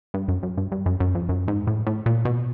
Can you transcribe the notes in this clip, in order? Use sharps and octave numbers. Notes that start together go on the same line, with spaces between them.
G2
F#2
F#2
G2
G2
F#2
F#2
F2
F#2
G#2
A2
A2
A#2
B2